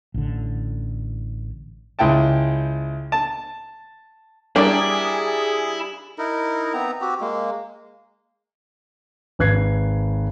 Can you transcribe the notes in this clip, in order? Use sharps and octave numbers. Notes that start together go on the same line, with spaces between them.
A1 D3
C#2 E4 G5 A5
A5
G3 D4 E4 G#4 A#4 D5
D#4 E4 A#4
B3 C4 A#5
C4 F#4 G4
G#3 A#3
G#1 B4 F#6 G#6 C7